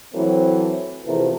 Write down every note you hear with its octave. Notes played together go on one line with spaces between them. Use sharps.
E3 F#3 A3 C4
E2 C3 E3 F3 A3 A#4